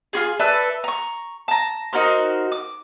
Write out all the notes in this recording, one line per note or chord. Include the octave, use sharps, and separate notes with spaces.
F4 F#4 G#4
A4 B4 D5 E5
A#5 C#6
A5 A#5
D#4 F#4 A#4 C5
D6